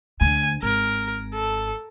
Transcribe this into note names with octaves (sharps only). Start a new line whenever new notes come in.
D2 D3 G#5
G#1 A#4
A4